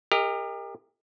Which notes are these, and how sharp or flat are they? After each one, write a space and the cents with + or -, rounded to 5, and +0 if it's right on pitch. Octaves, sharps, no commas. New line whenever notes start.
G4 +35 A#4 -10 D#5 +20